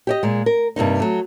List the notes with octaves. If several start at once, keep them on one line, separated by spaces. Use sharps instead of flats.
G4 D5 D#5
A#2 G#3
A#4
G2 C3 A#3 D#4
F#3 A3